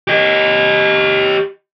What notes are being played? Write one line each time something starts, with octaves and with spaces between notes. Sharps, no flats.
G4 D#5